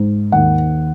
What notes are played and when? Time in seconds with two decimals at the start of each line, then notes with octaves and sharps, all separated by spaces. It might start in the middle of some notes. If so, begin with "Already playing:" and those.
Already playing: G#2
0.32 D#2 F#5